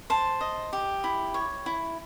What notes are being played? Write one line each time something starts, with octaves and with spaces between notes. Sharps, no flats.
C5 A5
D#5
G4
E4
C#5
E4